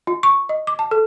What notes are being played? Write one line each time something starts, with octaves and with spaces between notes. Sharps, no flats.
F4
C#6
D#5
D6
A5
A4